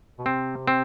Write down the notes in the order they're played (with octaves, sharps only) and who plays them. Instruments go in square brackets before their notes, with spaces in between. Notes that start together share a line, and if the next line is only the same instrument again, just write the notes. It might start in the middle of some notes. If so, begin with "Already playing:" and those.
[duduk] B2
[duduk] C3 [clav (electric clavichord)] C4
[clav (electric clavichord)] C4